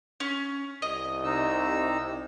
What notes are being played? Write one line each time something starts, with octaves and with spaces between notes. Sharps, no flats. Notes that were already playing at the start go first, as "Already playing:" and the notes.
C#4
C2 D#5
C3 D#4 E6